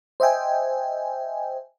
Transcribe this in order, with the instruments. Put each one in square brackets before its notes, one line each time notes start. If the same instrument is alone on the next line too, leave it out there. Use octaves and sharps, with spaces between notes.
[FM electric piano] C5 D#5 E5 G5 G#5